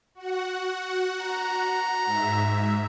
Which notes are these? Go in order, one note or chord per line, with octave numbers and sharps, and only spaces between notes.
F#4 F#5
A#5
G#2 E5